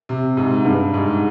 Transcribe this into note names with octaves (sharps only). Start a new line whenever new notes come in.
C3
G#2
G2
G#2